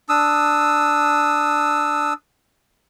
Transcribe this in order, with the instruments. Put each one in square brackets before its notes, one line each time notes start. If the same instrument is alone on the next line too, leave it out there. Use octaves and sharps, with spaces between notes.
[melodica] D4 D#6 E6